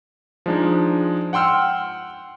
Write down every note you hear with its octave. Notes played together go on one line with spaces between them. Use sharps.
F3 G#3 D4 D#4
F#5 G5 C6 E6 F6